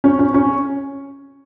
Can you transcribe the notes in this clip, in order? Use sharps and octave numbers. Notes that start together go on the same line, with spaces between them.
C#4
C#4
C#4